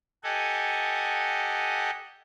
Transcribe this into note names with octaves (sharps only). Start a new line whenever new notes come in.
G4 A4 D#5 F#5 G#5